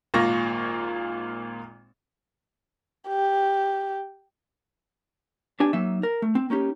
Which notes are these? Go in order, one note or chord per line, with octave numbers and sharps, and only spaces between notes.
G#1 A#2 A#3 F4 C#6 A#6
G4
B3 D4 G4 G#5
F#3 A#3 D#4 E5
A#4
A3
C4
A#3 C#4 D#4 G4